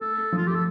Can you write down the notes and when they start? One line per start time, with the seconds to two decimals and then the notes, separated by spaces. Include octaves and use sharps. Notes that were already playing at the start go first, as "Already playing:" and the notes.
0.01 A3 A4
0.18 A3
0.32 F3
0.37 F4
0.47 A3 G4
0.55 A4